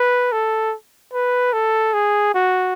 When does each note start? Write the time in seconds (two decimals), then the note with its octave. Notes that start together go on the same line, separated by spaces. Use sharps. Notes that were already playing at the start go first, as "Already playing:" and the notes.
Already playing: B4
0.32 A4
1.13 B4
1.53 A4
1.94 G#4
2.34 F#4